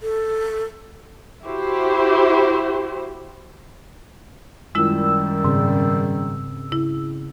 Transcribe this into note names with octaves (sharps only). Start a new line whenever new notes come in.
A4
E4 F#4 G4 C5
F#2 D#3 G3 G#3 E4 F4 E6
G#2 C#3 C4 G#4
C#3 E4